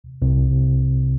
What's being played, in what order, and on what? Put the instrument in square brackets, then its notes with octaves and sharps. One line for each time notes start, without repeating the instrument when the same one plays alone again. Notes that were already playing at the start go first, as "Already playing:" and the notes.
[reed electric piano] C2 C3